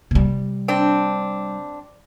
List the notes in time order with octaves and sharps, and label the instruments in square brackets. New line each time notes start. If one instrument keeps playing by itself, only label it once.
[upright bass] C3 G3
[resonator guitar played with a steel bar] C4 D4